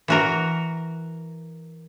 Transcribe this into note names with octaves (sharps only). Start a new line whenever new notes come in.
E3 F#4 A#4